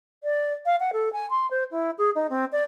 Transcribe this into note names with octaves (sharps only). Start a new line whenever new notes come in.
D5
F5
F#5
A4
G#5
C6
C5
E4
G#4
D#4
C4
D5